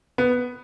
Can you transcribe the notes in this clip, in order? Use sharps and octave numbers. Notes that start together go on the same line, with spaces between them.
B3